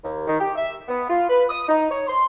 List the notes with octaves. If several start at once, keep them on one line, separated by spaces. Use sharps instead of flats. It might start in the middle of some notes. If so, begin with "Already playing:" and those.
D#2
D#3
G4
E5
B3
F4
B4
D#6
D#4
C#5
C6